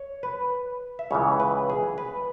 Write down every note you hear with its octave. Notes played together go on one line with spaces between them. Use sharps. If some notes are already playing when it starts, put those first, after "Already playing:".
Already playing: C#5
B4
E5
C#2 C#3 E3 C#5
B4
G#4
B4